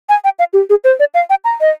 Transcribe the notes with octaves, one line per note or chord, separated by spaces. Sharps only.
G#5
G5
F5
G4
G#4
C5
D5
F5
G5
A#5
D#5